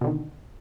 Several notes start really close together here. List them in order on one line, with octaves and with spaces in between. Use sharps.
B2 D3 D#3